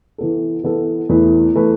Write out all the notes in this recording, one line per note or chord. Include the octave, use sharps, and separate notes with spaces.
E3 B3 A4
E3 B3 A4
E2 E3 A3 E4 B4
E3 A3 E4 B4